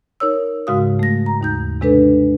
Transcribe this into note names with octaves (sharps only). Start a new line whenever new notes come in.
D#4 A#4 C#5 E6
G#2 C#3 G#3 F#4 F5 D#6
A3 A#6
A#5
D#2 D#4 G6
C3 G#3 D4 A4 B4